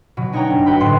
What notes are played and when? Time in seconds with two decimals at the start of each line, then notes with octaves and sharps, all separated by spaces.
0.17 B2 F#3
0.32 D4 D#4 C#5 F#5 G5 A#5
0.51 F#1
0.66 F#4 B4 G5 B5
0.80 G1 A2 A3 C6 F#6